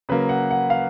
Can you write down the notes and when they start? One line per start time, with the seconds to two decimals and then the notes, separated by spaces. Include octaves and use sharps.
0.09 C#3 F#3 A#3 B4
0.29 F#5
0.51 F#5
0.70 F5